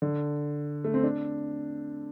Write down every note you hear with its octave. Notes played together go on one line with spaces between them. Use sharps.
D3
A3
C4
D4